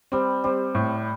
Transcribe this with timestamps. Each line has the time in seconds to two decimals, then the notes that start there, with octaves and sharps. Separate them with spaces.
0.12 G3 C4
0.44 G3 C4
0.75 A2